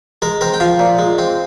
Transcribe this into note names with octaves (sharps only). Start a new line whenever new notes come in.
G#3 A#4
C4 A#4
G5
F3 F5
A#2
G#3
C4